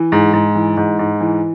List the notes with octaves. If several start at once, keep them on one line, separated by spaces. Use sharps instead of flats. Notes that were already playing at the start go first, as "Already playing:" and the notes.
Already playing: E3
G#2
G#2
E3
G#2
G#2
E3